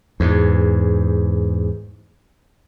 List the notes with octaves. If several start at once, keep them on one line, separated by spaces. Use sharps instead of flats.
E2 G#2